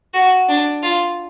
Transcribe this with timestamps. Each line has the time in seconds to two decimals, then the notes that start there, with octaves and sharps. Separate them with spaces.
0.14 F#4
0.48 D4
0.83 F4